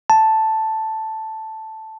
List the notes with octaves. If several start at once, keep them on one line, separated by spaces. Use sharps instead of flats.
A5